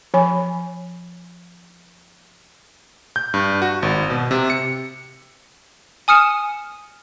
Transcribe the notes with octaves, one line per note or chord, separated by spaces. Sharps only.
F3 C#5 G#5 B5
G6
G2
F#4
G#1
B2
C3
C#7
G#5 D#6 F6 C#7 E7